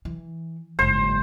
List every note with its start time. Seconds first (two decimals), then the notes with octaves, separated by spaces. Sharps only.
0.05 E3
0.79 F#1 G#2 C5